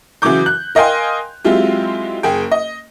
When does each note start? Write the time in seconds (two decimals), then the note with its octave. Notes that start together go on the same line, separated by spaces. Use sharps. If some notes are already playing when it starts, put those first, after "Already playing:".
0.22 C#3 E3 F#3 F#4 D6 G6
0.46 F#6
0.75 A#4 D#5 F5 G5 G#5 C6
1.44 F#3 G#3 C4 E4 F4 G4
2.23 F#1 G#4 G5
2.51 D#5